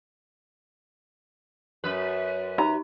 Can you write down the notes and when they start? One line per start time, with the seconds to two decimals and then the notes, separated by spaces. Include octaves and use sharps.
1.84 F#2 B4
2.58 D#4 A#5